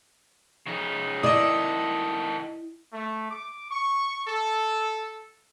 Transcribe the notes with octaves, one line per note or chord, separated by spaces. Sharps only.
C#3 D#4
D#3 E4 A4 D5 D#5 D#6
A3
D6
C#6
A4